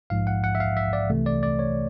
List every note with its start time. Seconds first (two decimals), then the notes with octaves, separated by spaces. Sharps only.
0.10 A#1 G#2 F3 F5
0.27 F#5
0.44 F#5
0.55 E5
0.60 F5
0.77 E5
0.93 D5
1.10 C2 C3 E3 A3
1.26 D5
1.43 D5
1.59 C#5